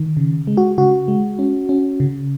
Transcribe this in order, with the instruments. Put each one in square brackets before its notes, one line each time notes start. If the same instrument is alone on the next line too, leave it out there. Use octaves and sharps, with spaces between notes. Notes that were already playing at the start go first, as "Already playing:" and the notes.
Already playing: [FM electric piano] D#3
C#3
G#3
F#4
C#3 F#4
G#3
C#4
C#4
C#3